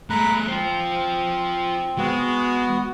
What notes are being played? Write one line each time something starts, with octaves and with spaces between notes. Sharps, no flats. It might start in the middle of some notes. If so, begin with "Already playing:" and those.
G#3 A3 A#5 B5 F#6
C4 F4 C5
G#3 B3 F#4